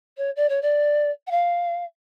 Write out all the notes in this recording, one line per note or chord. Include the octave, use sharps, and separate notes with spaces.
C#5
D5
C#5
D5
F#5
F5